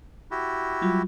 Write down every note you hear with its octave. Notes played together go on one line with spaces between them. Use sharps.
E4 F#4 G4
F#3 G3 F4